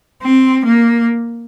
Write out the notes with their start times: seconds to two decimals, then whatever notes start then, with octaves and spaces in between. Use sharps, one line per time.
0.22 C4
0.65 A#3